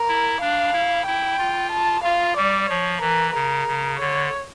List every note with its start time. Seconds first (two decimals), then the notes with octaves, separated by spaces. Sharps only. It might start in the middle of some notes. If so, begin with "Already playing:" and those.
Already playing: A#4
0.08 E4
0.41 D4 F5
0.73 E4
1.06 E4 G5
1.39 F4
1.71 A5
2.04 F4 F5
2.37 G3 D5
2.69 F3 C#5
3.01 E3 A#4
3.34 C#3 A#4
3.67 C#3
4.00 D3 C#5